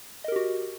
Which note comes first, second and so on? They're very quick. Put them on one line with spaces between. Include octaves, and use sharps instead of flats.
D#5 A#4 G4 F#4